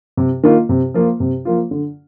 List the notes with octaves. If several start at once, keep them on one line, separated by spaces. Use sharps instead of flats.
C3
D#3 A#3 F4
C3
F3 A#3 F4
C3
F3 A#3 F4
D3